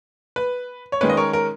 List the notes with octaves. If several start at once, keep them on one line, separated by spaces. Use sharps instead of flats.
B4
C#5
D#3 G#3 C#4 B4
D#5
A#4 C#5
A#4